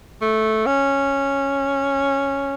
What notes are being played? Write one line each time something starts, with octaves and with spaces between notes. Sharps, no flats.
A3
C#4